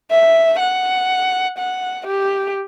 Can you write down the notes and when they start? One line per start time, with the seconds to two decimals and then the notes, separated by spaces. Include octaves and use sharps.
0.11 E5
0.59 F#5
1.58 F#5
2.07 G4